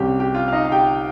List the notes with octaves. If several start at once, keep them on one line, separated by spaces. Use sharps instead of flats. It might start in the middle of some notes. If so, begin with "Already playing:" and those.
Already playing: C2 C3 G3 C#4 G4
G4
F4
F5
D#4 D#5
F5
G4 G5